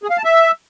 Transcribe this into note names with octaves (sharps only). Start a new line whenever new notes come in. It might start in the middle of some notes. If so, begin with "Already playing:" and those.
G#4
F5
A5
E5